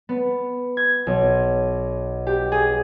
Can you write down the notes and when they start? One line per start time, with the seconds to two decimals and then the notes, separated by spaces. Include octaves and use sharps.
0.09 B3
0.77 G#6
1.07 B1
2.27 G4
2.52 G#4